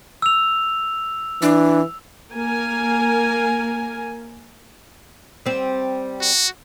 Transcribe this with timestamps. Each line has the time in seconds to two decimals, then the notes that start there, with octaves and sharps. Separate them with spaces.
0.22 E6 F7
1.42 E3 D4
2.33 A#3 A#4 G#5
5.46 G3 C4
6.22 F#4